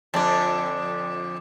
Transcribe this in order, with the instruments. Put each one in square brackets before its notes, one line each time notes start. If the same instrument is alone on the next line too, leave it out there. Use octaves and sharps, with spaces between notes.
[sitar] F2 D3 D4 [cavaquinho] D5 A5